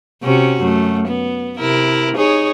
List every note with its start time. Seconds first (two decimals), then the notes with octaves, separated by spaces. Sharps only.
0.23 C3 C#4 F#4
0.60 F#2 A3
1.07 B3
1.59 C3 E4 A#4
2.16 D#4 G#4 C#5